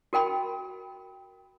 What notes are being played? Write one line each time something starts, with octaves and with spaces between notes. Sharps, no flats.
F#4 A#4 G5 B5